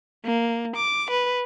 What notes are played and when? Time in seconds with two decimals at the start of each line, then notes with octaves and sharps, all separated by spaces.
0.25 A#3
0.76 D6
1.11 B4